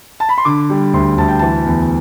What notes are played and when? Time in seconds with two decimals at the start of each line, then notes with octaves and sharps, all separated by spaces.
0.20 A5
0.29 B5
0.38 C6
0.45 D3 D6
0.70 G3
0.94 D2 C6
1.18 D2 A5
1.28 G5
1.39 E3 A5
1.66 E2